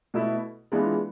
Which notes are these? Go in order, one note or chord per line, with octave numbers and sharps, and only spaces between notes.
B2 A3 E4
E3 G#3 B3 D4 F4